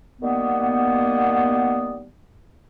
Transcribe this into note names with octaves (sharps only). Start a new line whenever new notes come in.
D#3 G3 A#3 B3